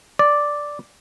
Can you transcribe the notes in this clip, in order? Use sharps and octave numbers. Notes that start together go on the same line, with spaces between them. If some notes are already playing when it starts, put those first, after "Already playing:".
D5